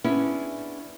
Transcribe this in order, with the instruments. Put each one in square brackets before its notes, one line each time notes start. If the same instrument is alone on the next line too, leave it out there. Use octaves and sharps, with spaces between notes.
[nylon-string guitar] B3 C#4 D4 E4 G#4